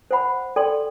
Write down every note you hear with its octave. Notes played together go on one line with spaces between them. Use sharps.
C5 F#5 B5
A4 D5 G5 C6